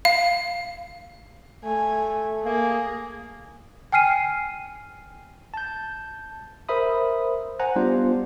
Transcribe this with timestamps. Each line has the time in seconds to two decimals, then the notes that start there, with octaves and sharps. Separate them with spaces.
0.05 F5
1.65 A3 G#5
2.44 A#3 G#4
3.92 G5 G#5 F6 C7 D#7
5.54 A5 G6
6.69 A#4 C5 E5 B5 D#6
7.60 C5 F#5 G#5 A#5 F#6
7.76 G3 B3 D4 F4 C5